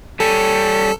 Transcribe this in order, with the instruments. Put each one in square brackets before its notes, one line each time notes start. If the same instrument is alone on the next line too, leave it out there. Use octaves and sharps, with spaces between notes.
[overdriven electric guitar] G3 C#4 [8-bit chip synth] A4